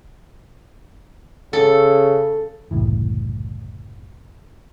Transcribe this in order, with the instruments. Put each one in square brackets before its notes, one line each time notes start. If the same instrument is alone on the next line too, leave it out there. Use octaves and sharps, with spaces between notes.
[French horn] C#3 [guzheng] A4
[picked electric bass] F#1 C2 A2 E3